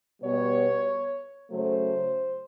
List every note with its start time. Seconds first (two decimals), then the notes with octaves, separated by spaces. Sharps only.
0.21 B2 G3 B3 C#5
1.49 C#3 F#3 A3 C5